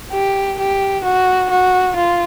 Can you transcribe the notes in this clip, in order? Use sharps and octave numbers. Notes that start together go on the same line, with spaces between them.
G4
G4
F#4
F#4
F4